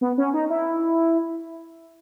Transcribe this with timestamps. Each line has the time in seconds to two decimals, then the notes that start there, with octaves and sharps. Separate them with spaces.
0.01 B3
0.18 C#4
0.34 D#4
0.50 E4